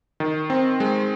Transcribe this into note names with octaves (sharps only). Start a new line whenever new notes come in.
D#3
C4
G#3